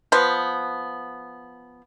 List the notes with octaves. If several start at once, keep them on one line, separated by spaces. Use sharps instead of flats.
F3 B3